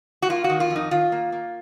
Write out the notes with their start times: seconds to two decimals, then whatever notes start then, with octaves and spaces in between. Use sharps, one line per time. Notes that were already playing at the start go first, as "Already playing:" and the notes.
0.22 F#4
0.29 A#3 F4
0.44 F#4
0.50 D#3
0.60 F4
0.70 F2
0.76 D#4
0.91 D#3 F4
1.12 A#3
1.32 A#3